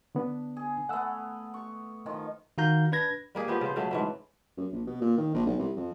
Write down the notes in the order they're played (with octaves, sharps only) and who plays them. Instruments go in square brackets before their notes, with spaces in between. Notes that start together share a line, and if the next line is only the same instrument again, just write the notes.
[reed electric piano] D3 B3 D4
[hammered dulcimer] G#4
[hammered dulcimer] A3 B3 [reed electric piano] F#5 E6
[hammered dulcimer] C#6
D#3 F3
[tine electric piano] D#3 F#4 F5 A#5 G6
D4 B4 G#6 A#6
[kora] G3 A#3 G#4
F3 B3 G4 E5
C#3 C5
C#3 F#3 A3
G#2 E3 A3
[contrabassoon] F#2
A#1
B2
A#2
D#3
A#1
B1
C2
F2